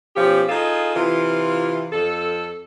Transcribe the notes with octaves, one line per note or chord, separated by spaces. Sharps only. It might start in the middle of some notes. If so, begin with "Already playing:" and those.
B2 F3 C#4 G4
D#4 F4 G#4 A4
C3 E3 F4
F2 A4